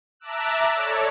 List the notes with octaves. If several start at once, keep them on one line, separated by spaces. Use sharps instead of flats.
E5 A5 A#5 D6 E6 F#6
A4 C#5 D5